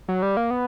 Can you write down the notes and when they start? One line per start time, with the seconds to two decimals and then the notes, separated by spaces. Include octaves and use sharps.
0.08 F#3
0.22 G3
0.37 A#3
0.50 B3